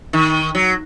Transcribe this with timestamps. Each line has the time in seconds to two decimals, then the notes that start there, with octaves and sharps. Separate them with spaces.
0.13 D#3
0.55 F#3